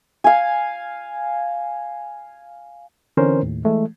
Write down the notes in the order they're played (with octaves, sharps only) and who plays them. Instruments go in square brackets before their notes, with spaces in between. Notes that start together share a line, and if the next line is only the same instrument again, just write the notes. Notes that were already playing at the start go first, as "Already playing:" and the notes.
[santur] F5 G#5
[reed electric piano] D3 E3 C4 C#4 A#4 C5
D#2 A2
E3 G#3 A3